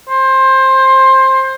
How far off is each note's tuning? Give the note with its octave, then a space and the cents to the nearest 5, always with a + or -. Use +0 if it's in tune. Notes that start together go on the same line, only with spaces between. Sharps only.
C5 +20